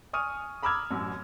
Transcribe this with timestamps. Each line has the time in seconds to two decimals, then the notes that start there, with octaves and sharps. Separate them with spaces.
0.13 G#5 C#6 D#6 F6 D#7
0.63 A#5 B5 D6 E6 F6 G#6
0.91 A1 F#2